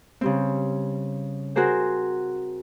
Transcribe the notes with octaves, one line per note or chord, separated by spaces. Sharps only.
C#3 G3 C4
F#4 G#4 A#4 C5 G5